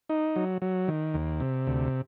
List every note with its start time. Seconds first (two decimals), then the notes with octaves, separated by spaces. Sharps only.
0.09 D#4
0.36 F#3
0.62 F#3
0.88 D#3
1.14 D#2
1.40 C3
1.67 D2